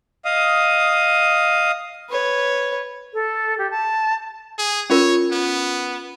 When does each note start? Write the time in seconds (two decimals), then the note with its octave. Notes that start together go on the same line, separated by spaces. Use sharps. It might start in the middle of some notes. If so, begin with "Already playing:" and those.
0.25 D#5 F5 D#6
2.10 B4 C#5
3.13 A4
3.58 G4
3.70 A5
4.58 G#4
4.90 C#4 F4 A#4 C#5
5.32 B3